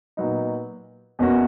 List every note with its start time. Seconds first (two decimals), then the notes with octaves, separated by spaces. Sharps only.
0.17 A#2 F#3 B3 D#4
1.19 E2 B2 A#3 C#4 F#4